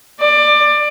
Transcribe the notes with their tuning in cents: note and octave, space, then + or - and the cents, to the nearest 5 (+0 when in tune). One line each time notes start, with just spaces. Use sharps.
D5 +20